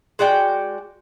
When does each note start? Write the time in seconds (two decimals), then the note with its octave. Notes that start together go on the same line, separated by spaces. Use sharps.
0.19 G#3 F#4 D5 G5